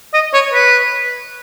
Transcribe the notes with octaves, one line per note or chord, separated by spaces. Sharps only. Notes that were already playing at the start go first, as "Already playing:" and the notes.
D#5
C#5
B4